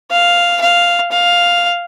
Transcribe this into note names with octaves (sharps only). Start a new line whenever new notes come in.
F5
F5
F5